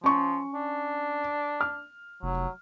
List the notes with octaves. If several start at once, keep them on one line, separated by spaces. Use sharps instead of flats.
F3 C#4 C#6
D4
F6
F1 F#3